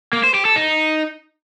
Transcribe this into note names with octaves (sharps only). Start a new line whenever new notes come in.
A#3
C5
G4
A4
D#4